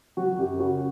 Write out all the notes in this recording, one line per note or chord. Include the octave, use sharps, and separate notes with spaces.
F#3 F#4
F#2 G4
C#3 F#4